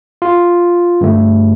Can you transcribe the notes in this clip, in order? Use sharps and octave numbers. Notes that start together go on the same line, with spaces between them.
F4
G2 D3 A3